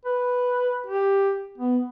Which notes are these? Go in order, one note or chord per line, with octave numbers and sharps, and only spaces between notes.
B4
G4
B3